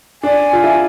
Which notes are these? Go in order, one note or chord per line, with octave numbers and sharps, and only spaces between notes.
D4 G#5
F4
E4